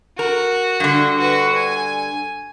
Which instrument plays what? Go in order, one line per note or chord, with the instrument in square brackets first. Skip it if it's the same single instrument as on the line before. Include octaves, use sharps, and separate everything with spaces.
[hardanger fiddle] F#4 [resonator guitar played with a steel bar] A#4
[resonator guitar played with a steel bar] G2 D3
[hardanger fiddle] F#4 B4
G#5